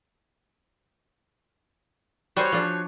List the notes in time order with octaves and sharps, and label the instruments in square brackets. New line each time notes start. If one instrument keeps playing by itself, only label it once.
[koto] G3 G#5 [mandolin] F#4 C5 C#5
[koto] F3 D4